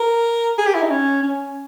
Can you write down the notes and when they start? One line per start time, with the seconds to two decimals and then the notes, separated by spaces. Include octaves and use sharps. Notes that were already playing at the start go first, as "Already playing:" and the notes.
Already playing: A#4
0.58 G#4
0.66 G4
0.74 E4
0.83 D#4
0.90 C#4
1.23 C#4